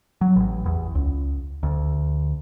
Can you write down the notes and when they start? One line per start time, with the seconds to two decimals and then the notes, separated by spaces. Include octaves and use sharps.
0.21 F#3
0.36 A1
0.66 E2
0.95 C#2
1.63 D2